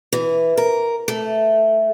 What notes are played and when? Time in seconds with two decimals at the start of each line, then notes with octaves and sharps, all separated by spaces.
0.13 E3
0.57 A#4
1.08 A3